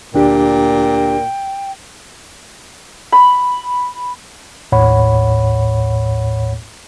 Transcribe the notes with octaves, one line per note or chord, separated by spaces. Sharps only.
D2 A#2 D4 G4 G5
B5
A#1 D#2 A2 C#5 F#5 B5